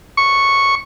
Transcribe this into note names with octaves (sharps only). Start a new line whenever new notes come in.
C#6